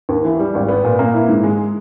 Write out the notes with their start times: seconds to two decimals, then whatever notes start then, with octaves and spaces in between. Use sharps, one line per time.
0.09 D#2
0.24 E3
0.39 G3
0.54 G#1
0.68 B3
0.84 A#2
0.99 A#3
1.14 E4
1.29 G#2
1.43 G#3